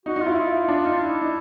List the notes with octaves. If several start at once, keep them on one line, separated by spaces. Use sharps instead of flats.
D#4 F#4
D#4
F4
E4
F4
D4
D#4
E4
D#4